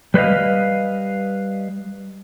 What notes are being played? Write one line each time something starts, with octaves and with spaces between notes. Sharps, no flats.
G3 B4 C5 D#5 F5